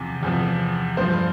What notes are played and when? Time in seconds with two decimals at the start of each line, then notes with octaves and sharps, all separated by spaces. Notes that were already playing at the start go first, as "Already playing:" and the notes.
Already playing: E2 C3 F3
0.23 E2 C3 F3
0.97 G2 F3 C5